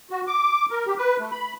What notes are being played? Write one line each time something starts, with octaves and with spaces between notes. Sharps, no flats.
F#4
D6
A#4
G4
B4
A3
B5